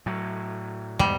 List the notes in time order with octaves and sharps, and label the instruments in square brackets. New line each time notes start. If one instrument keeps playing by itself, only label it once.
[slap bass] A2 F#3
[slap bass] E2 G#2 B2 [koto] G3